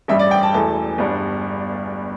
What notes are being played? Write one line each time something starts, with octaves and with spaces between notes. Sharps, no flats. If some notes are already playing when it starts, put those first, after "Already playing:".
A1 G2 G3 E5
D5
G5
A5
E1 E2 E3 A3 A5
G1 G2 G3 D4